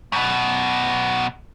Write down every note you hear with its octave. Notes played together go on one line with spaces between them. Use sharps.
F#2 B2